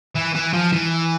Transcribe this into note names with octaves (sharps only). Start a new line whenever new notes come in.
E3
E3
F3
E3